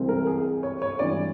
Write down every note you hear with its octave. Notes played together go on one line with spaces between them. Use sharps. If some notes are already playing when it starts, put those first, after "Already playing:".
Already playing: C2 C3 E3 G#3 C4
A#4
G#4
C#5
C#5
G#1 G2 E3 D5